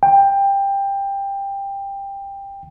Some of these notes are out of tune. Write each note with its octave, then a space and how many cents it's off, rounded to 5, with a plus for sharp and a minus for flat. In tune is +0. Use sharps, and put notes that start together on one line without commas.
G5 +15